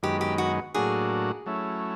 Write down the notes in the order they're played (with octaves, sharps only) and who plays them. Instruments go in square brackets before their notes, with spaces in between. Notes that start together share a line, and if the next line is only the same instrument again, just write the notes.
[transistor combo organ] F#2 D#3 G#3 B3 [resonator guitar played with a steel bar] G4
[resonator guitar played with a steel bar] G4
F#4
[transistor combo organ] A2 F#3 A#3 D4 F#4 [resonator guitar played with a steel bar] G#4
[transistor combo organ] F#3 A3 C#4 E4